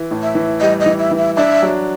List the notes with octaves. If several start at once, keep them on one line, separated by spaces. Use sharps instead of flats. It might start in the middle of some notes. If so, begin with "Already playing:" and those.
Already playing: E3
A2
E5
E3
G3 D#5
D#5
E3
E5
E3
E5
D4 E5
F#3